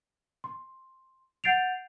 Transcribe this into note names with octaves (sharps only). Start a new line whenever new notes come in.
C6
F#5 G6 A6 C7 D7 F7